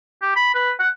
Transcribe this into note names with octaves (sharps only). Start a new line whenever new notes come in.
G4
B5
B4
F#5